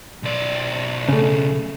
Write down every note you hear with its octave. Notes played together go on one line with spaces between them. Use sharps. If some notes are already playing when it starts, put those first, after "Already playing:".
B1 D5
C#3 A3